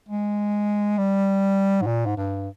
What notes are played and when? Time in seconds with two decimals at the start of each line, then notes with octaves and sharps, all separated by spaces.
0.09 G#3
0.98 G3
1.82 G#2
1.87 A#2
2.06 G#2
2.17 G2